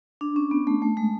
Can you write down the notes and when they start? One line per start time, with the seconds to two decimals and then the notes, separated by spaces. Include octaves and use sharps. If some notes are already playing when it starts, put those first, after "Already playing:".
0.21 D4
0.36 C#4
0.51 B3
0.67 A3
0.82 A3
0.97 G#3